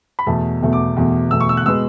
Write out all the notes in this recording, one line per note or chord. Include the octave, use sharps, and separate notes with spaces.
B5
E2 B2 A3 A5
E2 B2 A3
D6
E2 B2 A3
E2 B2 A3 E6
C#6
E6
F#6
B2 G#3 B3 E6